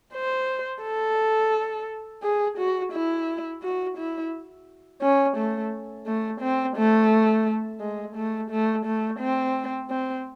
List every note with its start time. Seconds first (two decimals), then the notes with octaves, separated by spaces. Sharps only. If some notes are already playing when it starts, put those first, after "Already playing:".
0.14 C5
0.83 A4
2.23 G#4
2.58 F#4
2.93 E4
3.63 F#4
3.98 E4
5.02 C#4
5.37 A3
6.06 A3
6.41 C4
6.77 A3
7.80 G#3
8.16 A3
8.51 A3
8.86 A3
9.20 C4
9.90 C4